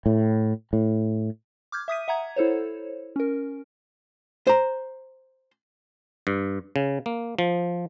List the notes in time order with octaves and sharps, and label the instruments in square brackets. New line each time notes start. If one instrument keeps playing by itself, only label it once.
[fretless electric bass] A2
A2
[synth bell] D6 F6 G6 G#6
E5 D#6 B6 D#7
E5 F#5 A#5 G#6
E4 A4 C5 C#5
C#4 A#4
[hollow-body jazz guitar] C5 A#5
[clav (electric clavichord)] G2
C#3
A#3
F3